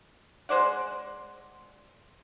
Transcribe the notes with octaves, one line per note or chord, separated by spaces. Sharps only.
G#3 C5 D5 F#5